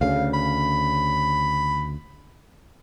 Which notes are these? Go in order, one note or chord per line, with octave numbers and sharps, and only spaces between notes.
D2 C#3 F5
B5